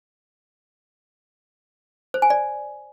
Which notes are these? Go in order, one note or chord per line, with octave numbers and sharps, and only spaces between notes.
C5
G#5
D5